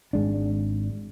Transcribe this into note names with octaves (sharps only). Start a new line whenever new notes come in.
G#1 G#3 D4